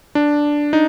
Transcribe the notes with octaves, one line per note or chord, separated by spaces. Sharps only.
D4
D#4